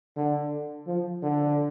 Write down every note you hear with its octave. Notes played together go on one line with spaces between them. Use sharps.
D3
F3
D3